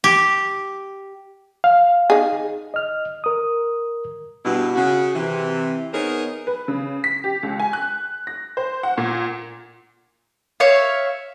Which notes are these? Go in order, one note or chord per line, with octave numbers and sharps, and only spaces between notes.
G4
F5
D#4 G#4
D#5 F6
A#4 D#6
G2 B2 E4
C#3 F#4
C3 E3
B3 D#4 G#4 A#4 C5 C#5
B4
C#3
B6
G4
C#2
G#5
F#6
A#6
C5
F#5
A#2
C#5 E5 F5